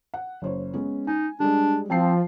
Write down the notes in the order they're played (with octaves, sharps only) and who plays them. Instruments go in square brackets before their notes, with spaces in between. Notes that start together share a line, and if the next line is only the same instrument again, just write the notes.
[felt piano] F#5
F#1 C5 C#5
G#3 B3 C#4
[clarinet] D#4 [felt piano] G#5
[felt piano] G3 G#3 [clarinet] D4
[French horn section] F3 [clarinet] C4 [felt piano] G5 A5 C7